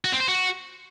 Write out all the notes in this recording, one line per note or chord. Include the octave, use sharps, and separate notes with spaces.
F#4
C4
C5
F#4